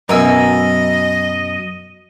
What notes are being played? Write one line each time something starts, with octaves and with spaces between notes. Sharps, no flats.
F#2 B2 A#4 D#5 G#5 E6